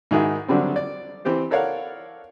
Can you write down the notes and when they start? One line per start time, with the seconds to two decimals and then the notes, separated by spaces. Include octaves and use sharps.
0.11 G#2 D#3 D#4 E4 F#4 G#4
0.48 D3 F#3 G3 C4
0.76 D5
1.25 E3 C4 G4 C5
1.50 A4 A#4 C#5 D5 F5 F#5